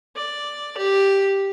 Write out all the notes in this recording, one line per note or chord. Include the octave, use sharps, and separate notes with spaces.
D5
G4